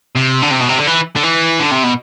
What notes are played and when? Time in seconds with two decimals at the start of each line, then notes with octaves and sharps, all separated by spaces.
0.15 C3
0.42 D3
0.51 C3
0.60 B2
0.69 C3
0.78 D3
0.87 E3
1.16 D3
1.23 E3
1.60 D3
1.71 C3
1.84 B2